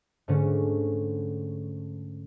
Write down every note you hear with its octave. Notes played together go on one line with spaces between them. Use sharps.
G#2 D3 A3 C#4